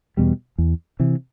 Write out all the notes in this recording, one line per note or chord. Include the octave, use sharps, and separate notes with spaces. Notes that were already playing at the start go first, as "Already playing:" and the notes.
E2 B2 G3
E2
C3 E3